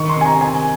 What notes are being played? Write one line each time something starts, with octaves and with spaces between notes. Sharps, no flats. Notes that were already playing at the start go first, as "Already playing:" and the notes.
Already playing: D#3 C#6
C6
C3 G#5
A#5
D#3 G#5